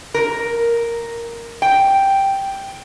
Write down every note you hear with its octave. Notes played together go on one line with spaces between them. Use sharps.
A#4
G5